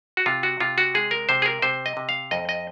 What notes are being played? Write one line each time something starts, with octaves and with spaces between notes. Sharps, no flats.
F#4
C3 F4
F#4
C3 F4
F#4
G#3 G#4
A#4
C3 C5
G#4
A#4
C3 C5
D#5
C3
F5
F2 D#5
D#5